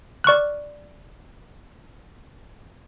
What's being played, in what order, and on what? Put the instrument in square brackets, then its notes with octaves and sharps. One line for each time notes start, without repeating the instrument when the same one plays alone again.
[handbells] D5 C#6 F6 F#6